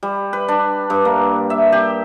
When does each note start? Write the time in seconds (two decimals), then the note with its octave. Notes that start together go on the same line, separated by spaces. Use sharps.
0.03 G3
0.33 B4
0.48 D4
0.90 G2
1.05 A#3
1.50 E5
1.72 G4